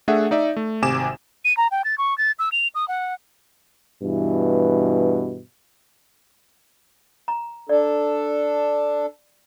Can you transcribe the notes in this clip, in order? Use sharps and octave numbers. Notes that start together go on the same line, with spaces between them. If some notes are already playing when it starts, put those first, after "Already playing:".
A3 D4 G#4 E5 F#5
D#4 D5 E5
A3
G#1 C3 G#5 D6 E7
D#7
A#5
G5
A6
C#6
A6
E6
F7
D#6
F#5
G2 B2 E3
A#5
D4 A4 D5